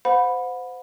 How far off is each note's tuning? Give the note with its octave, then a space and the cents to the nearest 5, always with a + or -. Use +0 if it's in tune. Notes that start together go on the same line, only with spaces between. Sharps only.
C5 -25 F#5 -35 B5 +0